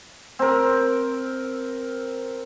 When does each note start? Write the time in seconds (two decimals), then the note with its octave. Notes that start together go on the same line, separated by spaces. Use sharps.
0.39 C4 A#4